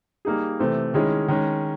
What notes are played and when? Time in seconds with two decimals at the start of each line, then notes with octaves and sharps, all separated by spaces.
0.25 G3 A#3 D#4 G#4
0.60 C3 E3 A3 C4
0.94 D#3 G#3 C#4 E4 G#4
1.28 D#3 G#3 C#4